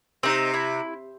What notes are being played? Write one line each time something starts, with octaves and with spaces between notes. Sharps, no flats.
C3 C4 D#4
E4